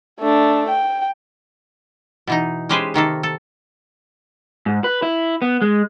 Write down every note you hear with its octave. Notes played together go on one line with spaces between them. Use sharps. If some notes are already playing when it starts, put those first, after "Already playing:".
A3 D4
G5
B2 E3 D#4
G#3 C#4 G4 G#4 B4 C5
C3 D#3 A#3 A4
A4
G#2
B4
E4
B3
G#3